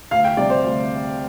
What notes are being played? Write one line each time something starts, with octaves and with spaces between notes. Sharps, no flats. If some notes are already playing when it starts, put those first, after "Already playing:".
D2 F5
G5
C3 G3 D5
C5
D2